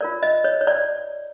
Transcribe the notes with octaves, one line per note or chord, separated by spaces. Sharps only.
F4 A#4 C#5 D5
D#5
C#5
C#5
D5